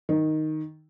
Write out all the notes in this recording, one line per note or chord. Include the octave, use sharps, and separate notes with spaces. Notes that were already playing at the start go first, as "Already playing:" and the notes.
D#3